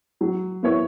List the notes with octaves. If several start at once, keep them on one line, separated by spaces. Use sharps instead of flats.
F#3
B3 E4 C#5